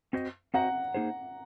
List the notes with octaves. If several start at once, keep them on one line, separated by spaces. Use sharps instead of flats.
C4 F#4 C5 D#5
C4 F#4 C5 D#5 F#5 A#5
A#3 D#4 G#4 C5